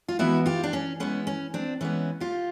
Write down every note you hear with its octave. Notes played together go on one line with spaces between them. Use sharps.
F4
E3 G#3 B3 E4 F#4
F4 G4
D4
C#4
E3 G#3 B3 C#4
C#4
C4 D4
E3 G#3 B3 C#4
F4 G4